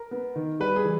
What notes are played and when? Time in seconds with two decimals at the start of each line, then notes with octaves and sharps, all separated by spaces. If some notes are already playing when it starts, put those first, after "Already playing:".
Already playing: A#4
0.11 B3
0.36 D#3
0.60 G3 B4
0.76 G#4
0.85 E3